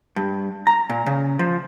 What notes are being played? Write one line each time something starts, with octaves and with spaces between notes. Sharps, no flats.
G2
A#5
A#2
C#3
F3